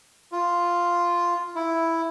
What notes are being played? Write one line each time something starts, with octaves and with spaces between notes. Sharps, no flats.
F4
E4